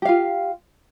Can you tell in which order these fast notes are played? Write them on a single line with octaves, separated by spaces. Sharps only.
G4 F5 F4